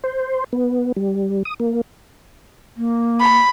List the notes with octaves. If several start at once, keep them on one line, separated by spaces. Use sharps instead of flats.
C5
B3
G3
D#6
A#3
A#3
B5